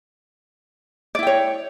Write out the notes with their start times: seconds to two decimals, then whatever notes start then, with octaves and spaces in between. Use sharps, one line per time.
1.15 D5
1.19 E4
1.23 G5
1.27 C#5